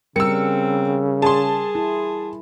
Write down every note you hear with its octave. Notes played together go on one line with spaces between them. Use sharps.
C#3 G3 C4 A#4 E6 C#7
G#4 A5 C6
E4